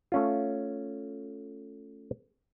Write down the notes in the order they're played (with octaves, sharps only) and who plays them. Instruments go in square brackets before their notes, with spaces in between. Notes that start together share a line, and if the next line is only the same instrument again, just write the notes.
[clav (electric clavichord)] A3 C#4 F4